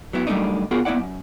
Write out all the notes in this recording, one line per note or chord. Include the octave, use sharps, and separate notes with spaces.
F#3 B3 E4
F#3 G3 A3 A#3 D4 D#4
B3 F4 F#4 G#4 A#4
A#3 B3 D#4 E4 D5 F#5
F#2